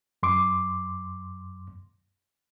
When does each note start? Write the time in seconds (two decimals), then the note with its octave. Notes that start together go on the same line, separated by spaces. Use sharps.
0.23 F#2 C6 D6